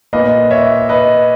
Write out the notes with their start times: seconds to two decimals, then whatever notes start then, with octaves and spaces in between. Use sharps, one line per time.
0.13 A#2 A#3 B4 D#5
0.51 C#5 E5
0.89 B4 D#5